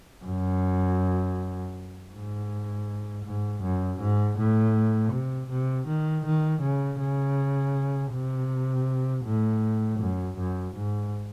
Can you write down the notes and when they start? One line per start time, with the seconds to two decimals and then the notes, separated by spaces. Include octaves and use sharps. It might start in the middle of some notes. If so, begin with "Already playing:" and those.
0.25 F#2
2.12 G#2
3.24 G#2
3.63 F#2
4.00 G#2
4.38 A2
5.12 C3
5.50 C3
5.87 D#3
6.26 D#3
6.62 C#3
7.00 C#3
8.12 C3
9.25 A2
9.99 F#2
10.38 F#2
10.75 G#2